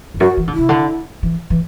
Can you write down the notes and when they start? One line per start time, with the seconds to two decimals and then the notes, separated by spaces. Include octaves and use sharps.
0.14 E2
0.20 F#2 F#4
0.37 E3
0.47 D3
0.54 C3 E4
0.69 D3
1.23 E3
1.50 E3